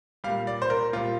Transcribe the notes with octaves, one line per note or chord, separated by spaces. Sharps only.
A#2 G3 F5
D5
C5
A#4
A#2 G3 F4